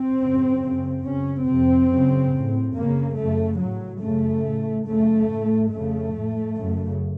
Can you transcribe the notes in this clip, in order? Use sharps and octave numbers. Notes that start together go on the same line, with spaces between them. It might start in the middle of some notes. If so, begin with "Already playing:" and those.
Already playing: C4
F#2 C#3
F#2 C#3
F#2 C#3 C#4
F2 C3 C4
F#2 C#3
A2
F#2 C#3 A#3
F#2 C#3 A3
A2 F#3
F#2 C#3 A3
A2
F#2 C#3 A3
A2
F2 C#3 A3
A2
F#2 C#3